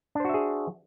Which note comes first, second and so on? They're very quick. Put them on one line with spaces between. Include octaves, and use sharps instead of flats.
D4 C5 F#4 E5 G#4